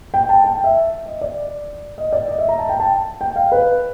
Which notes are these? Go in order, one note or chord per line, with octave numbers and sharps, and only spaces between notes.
G5
A5
G5
E5
D#5
D5
D#5
D5
D#5
E5
A#5
A5
G5
A5
G5
F5
B4